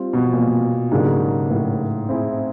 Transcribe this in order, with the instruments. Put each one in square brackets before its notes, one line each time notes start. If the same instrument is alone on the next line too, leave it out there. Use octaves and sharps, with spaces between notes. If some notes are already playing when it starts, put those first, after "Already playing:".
Already playing: [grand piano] G3 C4 F4
[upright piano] B2
A#2
[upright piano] G#2 [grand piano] C#3 F#3 A#3 D4 G4
[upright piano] A2
[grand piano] C4 E4 G#4